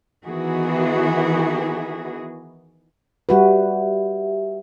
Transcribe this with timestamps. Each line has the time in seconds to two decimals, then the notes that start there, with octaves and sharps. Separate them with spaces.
0.25 D#3 E3 B3 E4 F#4 G#4
3.29 G3 F#4 G4 B4 E5